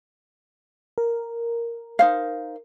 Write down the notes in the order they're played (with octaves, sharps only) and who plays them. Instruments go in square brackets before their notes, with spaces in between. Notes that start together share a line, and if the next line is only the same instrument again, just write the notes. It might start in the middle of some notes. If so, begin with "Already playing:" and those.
[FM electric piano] A#4
[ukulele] D#4 C5 F5